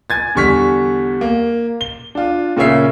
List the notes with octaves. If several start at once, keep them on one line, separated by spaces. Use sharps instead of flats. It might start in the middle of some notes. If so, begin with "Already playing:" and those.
G#5 G#6 A6
E2 D3 G3 C#6 F6 B6
A#3
G7
D4 F4
A#2 C#3 A#3 C#5 E5 C7